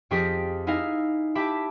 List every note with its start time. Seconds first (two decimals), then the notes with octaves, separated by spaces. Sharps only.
0.11 F2 F3 G4 G#4 D#5 B6
0.67 D#4 E4 D#5 F5 G#5
1.35 E4 G4 E5 A5 B5 D6